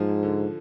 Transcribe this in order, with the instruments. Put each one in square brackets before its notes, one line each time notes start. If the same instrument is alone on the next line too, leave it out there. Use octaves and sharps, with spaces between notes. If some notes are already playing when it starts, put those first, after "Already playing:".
Already playing: [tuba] G#2 [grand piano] F3
[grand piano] D3